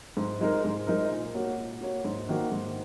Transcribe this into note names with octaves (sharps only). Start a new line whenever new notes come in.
G#2
G#3 D#4 A#4
G#2
G#3 D#4 A#4
A#2
A#3 F#4 C#5
A#2
A#3 F#4 C#5
G#2
D#3 A#3 F#4
G#2